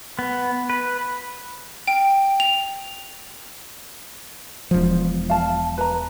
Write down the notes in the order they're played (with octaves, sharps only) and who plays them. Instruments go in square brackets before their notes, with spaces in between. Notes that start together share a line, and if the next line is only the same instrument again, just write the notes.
[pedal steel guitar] B3
B4
[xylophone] G5
F7
[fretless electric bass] E1 F3
[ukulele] F5 A5
B4 A#5